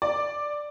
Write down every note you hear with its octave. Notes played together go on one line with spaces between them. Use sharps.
D5